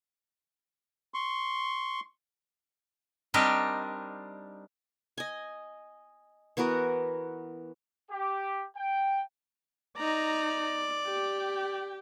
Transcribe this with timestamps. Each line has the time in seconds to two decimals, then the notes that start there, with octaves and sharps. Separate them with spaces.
1.14 C6 C#6
3.34 G3 C4 D4 D#4 G4 A#4
5.18 D#5 G#5
6.57 E3 B3 F#4 A#4
8.11 G4
8.76 G5
9.97 D#4 D5 A#5
11.06 G4 G5